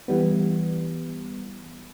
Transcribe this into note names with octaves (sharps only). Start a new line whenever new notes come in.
E3 G3 B3